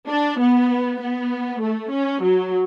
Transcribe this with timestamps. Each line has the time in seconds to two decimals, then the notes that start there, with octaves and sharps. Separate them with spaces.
0.08 D4
0.40 B3
1.00 B3
1.62 A3
1.91 C#4
2.23 F#3